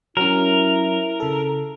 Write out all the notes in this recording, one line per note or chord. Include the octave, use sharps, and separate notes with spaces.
F#3 C#4 E4 A#4
C#3 A4